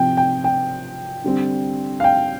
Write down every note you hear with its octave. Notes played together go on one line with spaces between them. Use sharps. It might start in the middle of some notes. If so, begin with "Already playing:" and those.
Already playing: C3 F3 C4 G5
G5
G5
D3 G3 C4
F5
G5